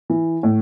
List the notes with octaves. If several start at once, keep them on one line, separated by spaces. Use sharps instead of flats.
E3
A2